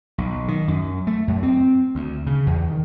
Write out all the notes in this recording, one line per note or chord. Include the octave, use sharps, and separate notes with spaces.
B1
D#3
F#2
A3
F#2
C4
D2
C#3
E2
D#3